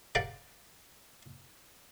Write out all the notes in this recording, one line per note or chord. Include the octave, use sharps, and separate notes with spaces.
G4 A#4 D5 F5 F#5